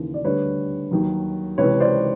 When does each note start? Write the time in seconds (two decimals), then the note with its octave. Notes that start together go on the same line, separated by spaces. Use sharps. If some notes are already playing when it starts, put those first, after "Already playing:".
Already playing: D#2 C#3 E3
0.14 D5
0.24 D2 D3 G3 B4 C#5
0.91 D#2 D#3 F#3
1.58 C#2 C3 E3 B4 C#5
1.80 C5 D5